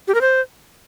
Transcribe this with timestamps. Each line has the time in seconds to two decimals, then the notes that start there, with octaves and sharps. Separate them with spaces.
0.08 G4
0.14 A#4
0.21 C5